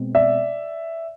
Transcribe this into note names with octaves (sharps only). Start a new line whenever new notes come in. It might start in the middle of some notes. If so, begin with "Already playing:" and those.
Already playing: B2 G#3 C4
D5 E5